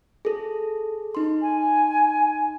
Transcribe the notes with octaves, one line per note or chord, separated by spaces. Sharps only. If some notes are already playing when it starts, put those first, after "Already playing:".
G#4 A4
D#4 C6
G#5